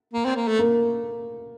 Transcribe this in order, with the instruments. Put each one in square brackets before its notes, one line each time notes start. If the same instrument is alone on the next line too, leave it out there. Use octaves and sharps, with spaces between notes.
[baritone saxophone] A#3
C4
A#3
A3
[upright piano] A#3